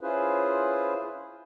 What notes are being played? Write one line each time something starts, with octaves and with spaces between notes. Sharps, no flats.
C#4 E4 F4 G#4 B4 C5